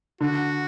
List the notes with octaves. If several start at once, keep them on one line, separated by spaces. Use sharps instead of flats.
D3 F#4